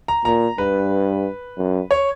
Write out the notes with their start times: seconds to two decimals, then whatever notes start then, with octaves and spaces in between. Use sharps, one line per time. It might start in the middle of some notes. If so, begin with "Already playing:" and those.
0.08 A#5
0.25 A#2 A#5
0.58 G2 B4
1.58 F#2
1.91 C#5